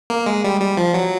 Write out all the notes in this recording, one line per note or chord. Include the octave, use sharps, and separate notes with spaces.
A#3
G#3
G3
G3
F3
F#3